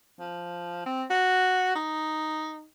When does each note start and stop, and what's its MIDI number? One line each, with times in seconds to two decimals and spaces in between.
0.20 0.84 53
0.86 1.03 60
1.10 1.71 66
1.75 2.67 63